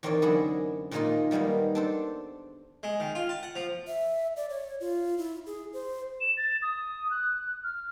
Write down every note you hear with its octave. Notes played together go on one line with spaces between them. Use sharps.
E2 D#3 C4 A#4 C#5 D5
F#2 D3 E4 G#4 D#5 B5
A#2 D#3 G#3 A#3 D#4 F4
D#3 G3 G#3 A#3 B3
D4 A4 C5
G#3
D#3
F4
A5
F#5
F3
E5
D5
C#5
F4
E4
G#4
C5
E7
A6
D#6
F#6
F6